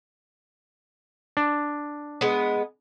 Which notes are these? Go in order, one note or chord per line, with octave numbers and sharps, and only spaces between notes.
D4
G#3 B3